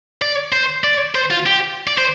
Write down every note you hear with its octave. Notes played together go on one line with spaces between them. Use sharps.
D5
C5
D5
C5
F4
G4
D5
C5